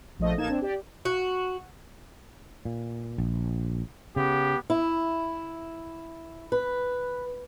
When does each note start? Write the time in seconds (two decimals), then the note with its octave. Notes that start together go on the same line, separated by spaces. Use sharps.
0.19 A#1 F3 A3 D#5
0.37 A1 A#3 D#4 A5 G#6 E7
0.49 C4 D4
0.62 G4 D5
1.05 F#4
2.65 A#2
3.18 A#1
4.16 C#3 B3 G4
4.70 E4
6.52 B4